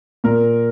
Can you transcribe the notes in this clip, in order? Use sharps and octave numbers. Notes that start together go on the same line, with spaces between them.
A#2 A#4